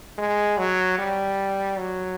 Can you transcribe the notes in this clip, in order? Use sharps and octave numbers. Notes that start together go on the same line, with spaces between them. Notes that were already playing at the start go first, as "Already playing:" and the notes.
G#3
F#3
G3
F#3